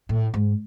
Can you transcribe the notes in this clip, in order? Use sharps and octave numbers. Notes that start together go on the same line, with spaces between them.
A2
G#2